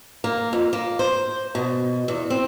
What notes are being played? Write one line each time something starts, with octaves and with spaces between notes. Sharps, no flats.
A#3
F2
A#3
C5
B2
E2
C4